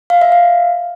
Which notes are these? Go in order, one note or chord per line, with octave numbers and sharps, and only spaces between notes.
F5
E5
F5